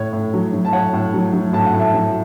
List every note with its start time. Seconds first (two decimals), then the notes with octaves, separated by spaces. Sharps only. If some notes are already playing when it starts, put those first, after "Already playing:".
Already playing: A2 C#5
0.13 A2
0.33 F#3
0.53 F#3
0.65 A5
0.73 A2 C#5 F#5
0.93 A2
1.14 F#3
1.33 F#3
1.53 A2 A5
1.66 F#5
1.73 A2
1.79 E5 A5
1.94 F#3